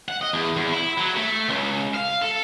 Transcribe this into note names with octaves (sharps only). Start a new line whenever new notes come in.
F#5
D#5
E2
E2
E4
F#3
A3
C#2
F5
A4